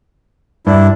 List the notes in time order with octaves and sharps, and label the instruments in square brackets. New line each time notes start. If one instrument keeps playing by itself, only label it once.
[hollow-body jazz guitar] G2 [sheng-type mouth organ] D4 E4